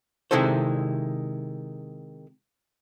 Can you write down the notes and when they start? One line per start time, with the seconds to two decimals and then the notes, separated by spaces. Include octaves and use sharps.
0.31 C3 D#3 G#3 E4 A4 C5